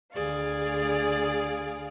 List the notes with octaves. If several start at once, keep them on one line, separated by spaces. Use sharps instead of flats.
D2 G#4 D5 F5